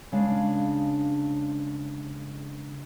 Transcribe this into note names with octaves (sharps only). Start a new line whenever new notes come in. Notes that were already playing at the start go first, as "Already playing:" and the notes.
C#3 G#3 D4 F5